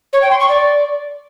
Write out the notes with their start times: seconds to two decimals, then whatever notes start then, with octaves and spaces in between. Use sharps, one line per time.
0.12 C#5
0.21 G5
0.30 C6
0.39 C#6
0.48 D5